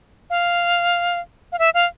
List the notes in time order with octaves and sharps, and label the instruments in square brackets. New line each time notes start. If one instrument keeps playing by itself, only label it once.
[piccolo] F5
F5
E5
F5